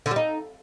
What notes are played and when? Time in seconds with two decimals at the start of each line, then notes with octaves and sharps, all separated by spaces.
0.06 D3
0.11 G3
0.16 D#4